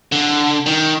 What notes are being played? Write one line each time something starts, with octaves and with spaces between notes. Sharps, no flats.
D3
D#3